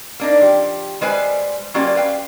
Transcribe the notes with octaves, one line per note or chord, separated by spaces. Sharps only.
A#3 D4 D#4
F3 G4
G3 G#3 B4 C5 G#5
F#3 A#3 C#4 F4 G4 D5
B4 F5 G5